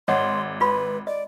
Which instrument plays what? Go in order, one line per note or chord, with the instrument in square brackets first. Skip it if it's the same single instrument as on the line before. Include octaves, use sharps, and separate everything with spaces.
[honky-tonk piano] G#1 [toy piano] C#5 D#5 F#5 [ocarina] C6
[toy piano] F4 B5 C6 [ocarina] B4
[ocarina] D5 [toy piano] D#5